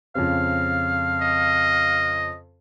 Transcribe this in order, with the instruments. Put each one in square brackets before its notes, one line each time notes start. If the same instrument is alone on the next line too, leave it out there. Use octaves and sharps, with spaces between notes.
[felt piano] F2 C#3 C4 [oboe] F5
[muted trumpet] D#5